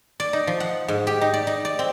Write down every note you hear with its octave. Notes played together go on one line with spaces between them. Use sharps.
D5
D#4
F3
F#5
G#2
G4
D#4
D5
D#4
D5
C4